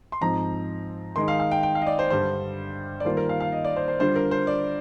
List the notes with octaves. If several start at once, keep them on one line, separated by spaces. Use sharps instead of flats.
C6
G#2 F3 C4 D#4 A#5
D#3 G#3 D#4 C6
F5
F5
G5
G5
F5
D#5
D5
C5
G2 D3 G3 C5
D5
D#3 G3 A#3 F4 C5
A#4
F5
F5
D#5
D5
C5
C5
D3 G3 D4 F4 C5
A#4
C5
D5